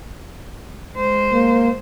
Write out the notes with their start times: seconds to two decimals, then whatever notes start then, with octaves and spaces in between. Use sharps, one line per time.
0.96 G#3 C5
1.32 A#3